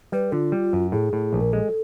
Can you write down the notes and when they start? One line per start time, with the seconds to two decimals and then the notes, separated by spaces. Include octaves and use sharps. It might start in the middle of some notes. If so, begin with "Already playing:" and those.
0.12 G3 B4
0.32 D3 F4
0.52 G3
0.73 F#2
0.92 A2 G#4
1.13 A2
1.33 A#1
1.40 A#4
1.52 G#3 A4